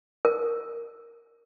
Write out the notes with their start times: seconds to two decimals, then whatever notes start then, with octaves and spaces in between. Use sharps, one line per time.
0.25 A#4